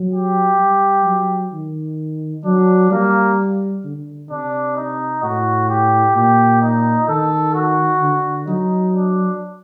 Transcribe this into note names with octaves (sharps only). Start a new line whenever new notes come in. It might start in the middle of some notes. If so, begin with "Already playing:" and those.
Already playing: F#3
G4
G3
F#3
D#3
F#3 D4
G3 A#3
D3
C3 D4
D#4
A2 F#4
G4
A#2 G4
D#4
D#3 A4
F#4
D3
F#3 D#4
D4